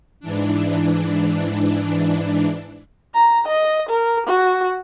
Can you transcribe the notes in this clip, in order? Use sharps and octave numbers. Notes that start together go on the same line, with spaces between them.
G#2 E3 D4
A#5
D#5
A#4
F#4